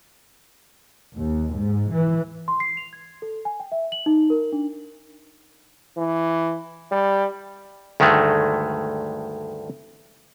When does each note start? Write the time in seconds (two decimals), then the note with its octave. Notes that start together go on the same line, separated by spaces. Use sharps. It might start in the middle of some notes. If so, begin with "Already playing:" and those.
1.17 D#2
1.54 G#2
1.92 E3
2.48 C6
2.60 C7
2.77 F7
2.93 G#6
3.22 A4
3.45 G#5
3.60 G5
3.72 E5
3.92 F#7
4.06 D#4
4.30 A#4
4.52 D4
5.97 E3
6.92 G3
8.00 D2 G2 D#3 G#3 A3